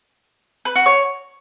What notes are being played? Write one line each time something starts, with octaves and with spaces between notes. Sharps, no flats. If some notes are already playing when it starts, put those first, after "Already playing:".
B4
F#4
C#5